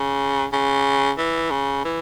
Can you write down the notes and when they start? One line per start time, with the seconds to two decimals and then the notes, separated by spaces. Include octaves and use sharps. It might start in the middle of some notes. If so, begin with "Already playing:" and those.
Already playing: C#3
0.53 C#3
1.18 E3
1.51 C#3
1.84 E3